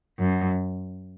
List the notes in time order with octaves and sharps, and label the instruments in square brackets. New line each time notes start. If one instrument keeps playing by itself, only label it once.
[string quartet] F#2